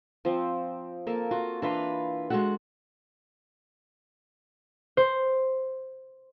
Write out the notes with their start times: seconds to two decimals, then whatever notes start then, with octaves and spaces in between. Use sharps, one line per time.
0.25 F3 C4
1.07 A#3 A4
1.31 F4 F#4
1.62 E3 D4 F4 B4 F5 C6
2.30 G#3 F#4 A4 F#5
4.97 C5